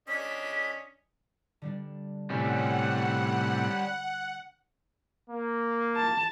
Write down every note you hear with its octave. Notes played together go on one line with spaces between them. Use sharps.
C#4 D4 D#5 B6
D3 G3 D4
A2 C3 G3 C#4 E5 F#5
A#3
A5